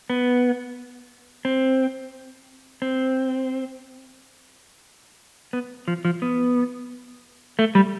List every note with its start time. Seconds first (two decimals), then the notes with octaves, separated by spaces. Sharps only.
0.10 B3
1.45 C4
2.82 C4
5.53 B3
5.88 F3
6.05 F3
6.22 B3
7.59 A3
7.75 G3